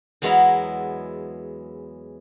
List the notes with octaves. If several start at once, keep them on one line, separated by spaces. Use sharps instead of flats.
E2 F#3 G#3 B3 E4 A#5